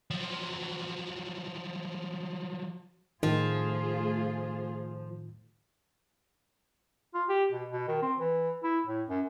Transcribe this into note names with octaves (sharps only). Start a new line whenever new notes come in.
F3 F#3
A2 D#3 F3 A3 F4 G#4
F4
G4
B2
B2
D#3
C4
E3
E4
A2
F#2